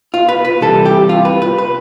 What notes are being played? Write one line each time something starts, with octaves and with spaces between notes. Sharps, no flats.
F4
B4
B4
C2 C3 E3 G3 A4
G4
F4
B4
B4
B4